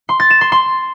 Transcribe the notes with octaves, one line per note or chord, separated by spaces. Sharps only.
C6
A6
E7
C6
C6